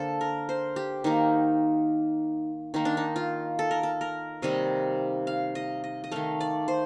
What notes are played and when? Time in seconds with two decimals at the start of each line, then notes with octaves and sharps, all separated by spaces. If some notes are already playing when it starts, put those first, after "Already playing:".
Already playing: D3 A#3 A4 C5
0.21 A#4
0.49 C5
0.76 G4
1.04 D#3 A#3 D#4
2.74 D#3 A#3 D#4
2.85 D4
2.97 D#4
3.16 F4
3.59 A4
3.71 A#4
3.83 A4
4.01 A#4
4.42 C3 D#3 G3 A#3 D#5
5.27 F5
5.55 D#5
5.84 D#5
6.04 D#5
6.12 D#3 A3 F5
6.41 D5
6.68 C5